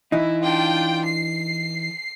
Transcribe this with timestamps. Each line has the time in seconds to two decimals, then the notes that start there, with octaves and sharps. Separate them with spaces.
0.12 E3 D#4 E4
0.42 D4 F4 G5
1.04 C7